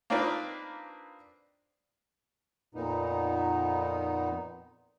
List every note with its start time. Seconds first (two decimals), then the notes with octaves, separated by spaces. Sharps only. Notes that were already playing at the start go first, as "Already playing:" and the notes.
0.10 A#3 C4 D4 D#4 F4 B4
2.75 F2 A#2 B3 D#4